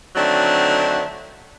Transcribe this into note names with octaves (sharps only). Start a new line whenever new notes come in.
D3 D#3 F#3 A3 C4 D4